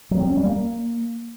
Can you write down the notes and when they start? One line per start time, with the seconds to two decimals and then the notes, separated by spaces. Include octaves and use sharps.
0.11 F#3
0.20 C4
0.28 C#4
0.37 G3
0.46 A#3